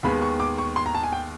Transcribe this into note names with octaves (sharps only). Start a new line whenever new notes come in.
D#2 D#3 G#3 B3 B5
C#6
D6
C#6
C6
A#5
A5
G#5
G5